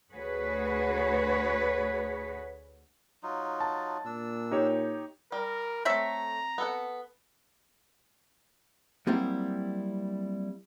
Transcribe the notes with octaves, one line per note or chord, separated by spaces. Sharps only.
D2 F#4 G#4 B4 C#5
F#3 D#4 F4
A5
A#2 D4 E6
D#4 G4 C#5
G3 A#4
A3 C4 C#5 E5 A#5
B3 A4 F#5
F#3 G3 A#3 C4 E4